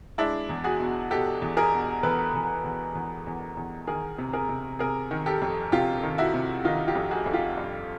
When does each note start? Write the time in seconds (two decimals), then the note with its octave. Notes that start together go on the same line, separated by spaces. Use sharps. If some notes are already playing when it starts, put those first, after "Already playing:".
0.18 G#3 D4 E4
0.49 E2
0.64 F#4 G#4
0.80 B2
1.10 B2 G4 A4
1.42 E2
1.57 G#4 A#4
1.72 B2
2.03 E2 A4 B4
2.34 E2
2.64 E2
2.95 E2
3.27 E2
3.57 E2
3.87 D#3 G#4 A#4
4.18 C3
4.33 G#4 A#4
4.49 C3
4.79 C3 G#4 A#4
5.11 D#3
5.26 G4 A4
5.42 F2
5.72 C3 F4 G4
6.03 D#3
6.18 E4 F#4
6.34 C3
6.64 D#3 D#4 F4
6.88 F4 G4
6.95 F2
7.11 F#4 G#4
7.26 F2
7.33 F4 G4
7.57 G2